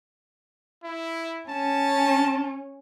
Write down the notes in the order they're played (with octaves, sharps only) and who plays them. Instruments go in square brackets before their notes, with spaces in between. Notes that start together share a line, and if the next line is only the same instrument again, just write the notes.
[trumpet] E4
[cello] C#4 [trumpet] A5